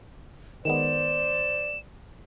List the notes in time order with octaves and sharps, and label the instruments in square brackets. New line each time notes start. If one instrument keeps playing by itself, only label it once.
[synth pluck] D#3 G#3 B3 [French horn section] C5 D5 [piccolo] E7